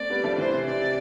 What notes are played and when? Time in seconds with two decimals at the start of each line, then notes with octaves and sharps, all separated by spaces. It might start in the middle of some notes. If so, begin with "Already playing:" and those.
Already playing: A3 C4 D5
0.10 G3 B3
0.23 F3 A3
0.38 C3 E3 C5
0.52 C3
0.66 C3 D5
0.81 C3